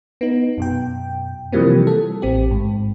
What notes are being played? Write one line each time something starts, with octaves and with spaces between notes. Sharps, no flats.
B3 D#4
F#2 B2 G5
C3 E3 F3 G3 A#3 C4
A4
A1 C4 G4
G#2